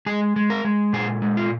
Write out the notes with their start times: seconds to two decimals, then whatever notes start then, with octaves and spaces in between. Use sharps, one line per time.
0.06 G#3 G#4
0.36 G#3
0.50 A#4
0.65 G#3
0.93 A#2 G#4
1.22 G#3
1.37 F4